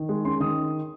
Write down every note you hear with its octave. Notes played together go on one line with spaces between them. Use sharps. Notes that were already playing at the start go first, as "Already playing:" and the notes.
Already playing: D#3
G#3
C#4 C6
D#3 D#6